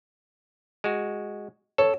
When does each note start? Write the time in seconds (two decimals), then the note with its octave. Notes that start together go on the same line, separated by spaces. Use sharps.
0.84 G#3 F#4
1.78 A4 C#5